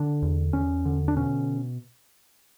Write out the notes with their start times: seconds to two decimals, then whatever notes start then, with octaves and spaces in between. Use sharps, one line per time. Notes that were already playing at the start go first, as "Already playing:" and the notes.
Already playing: D3 D4
0.22 E2
0.53 E2 C#4
0.85 D3
1.08 D4
1.16 B2 C#4